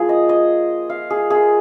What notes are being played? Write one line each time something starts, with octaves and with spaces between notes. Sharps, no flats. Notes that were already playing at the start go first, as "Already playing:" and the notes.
Already playing: F3 A#3 F4 G#4
D#5
D#5
F5
G#4
A#3 F4 G#4